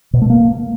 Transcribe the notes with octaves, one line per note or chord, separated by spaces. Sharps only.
B2
A3
A#3